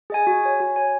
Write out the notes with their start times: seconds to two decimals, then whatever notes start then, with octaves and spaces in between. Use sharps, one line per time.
0.10 G#4 D#5 G#5
0.27 F#4
0.44 C#5 G#5
0.60 F#4
0.76 C#5 G#5